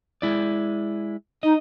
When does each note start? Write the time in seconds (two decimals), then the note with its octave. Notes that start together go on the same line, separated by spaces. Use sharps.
0.22 G#3 E4 D5
1.43 D#4 D#5